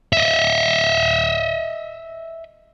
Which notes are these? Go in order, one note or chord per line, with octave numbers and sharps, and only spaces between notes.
D#5 E5